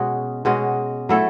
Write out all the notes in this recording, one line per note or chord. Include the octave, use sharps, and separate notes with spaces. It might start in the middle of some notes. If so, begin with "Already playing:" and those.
Already playing: B2 G#3 C#4 F#4
B2 G#3 C#4 F#4
F#3 A3 E4 A4